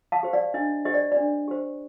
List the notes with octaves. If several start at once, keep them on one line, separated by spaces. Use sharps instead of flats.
F5 A5
G4 C5
D5 F5
D4 D#5
G4 C5 D#5
D5
D4 D5
G4 C5